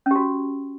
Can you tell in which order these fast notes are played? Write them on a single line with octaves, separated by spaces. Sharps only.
C#4 G4 F#4